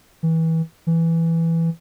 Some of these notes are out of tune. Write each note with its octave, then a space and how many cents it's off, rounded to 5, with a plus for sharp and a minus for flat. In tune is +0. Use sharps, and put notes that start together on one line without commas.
E3 -25
E3 +5